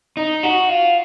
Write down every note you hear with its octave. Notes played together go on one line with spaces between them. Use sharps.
D#4
F#4
F4